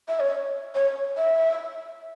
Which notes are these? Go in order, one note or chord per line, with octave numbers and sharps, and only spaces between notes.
E5
C#5
C#5
E5